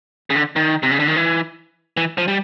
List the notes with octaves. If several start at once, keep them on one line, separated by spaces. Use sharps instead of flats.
C#3
D3
D#3
C3
C#3
D3
D#3
E3
E3
F3
G3